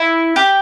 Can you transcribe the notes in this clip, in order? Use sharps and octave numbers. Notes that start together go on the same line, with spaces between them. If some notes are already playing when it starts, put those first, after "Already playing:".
Already playing: E4
G4